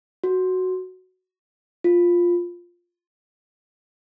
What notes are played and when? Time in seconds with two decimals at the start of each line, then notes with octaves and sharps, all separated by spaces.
0.24 F#4
1.84 F4